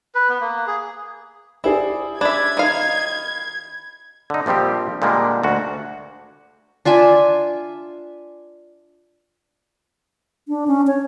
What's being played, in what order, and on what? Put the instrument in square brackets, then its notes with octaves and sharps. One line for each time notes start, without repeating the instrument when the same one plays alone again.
[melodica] B4
B3
A#3
G#4
[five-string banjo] E4 [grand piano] G4 G#4 D5
[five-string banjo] D4 E5 [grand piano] B5 [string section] G#6
[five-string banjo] D#3 F5
[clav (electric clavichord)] D3 D#4
A#1 F3 G3 C4 G4
A#2 D3 G3 G#3 A#3
D2 F#4
[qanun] D4 F4 E5 G#5
[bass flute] D4
C#4
C#5